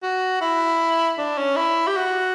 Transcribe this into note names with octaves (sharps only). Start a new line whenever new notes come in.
F#4
E4
D4
C#4
E4
G4
F#4